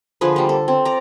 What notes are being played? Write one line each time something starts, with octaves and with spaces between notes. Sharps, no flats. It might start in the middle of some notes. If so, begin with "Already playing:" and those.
D3 F3 G#4 B4
G3 A#3
A4
C4
D5 A#5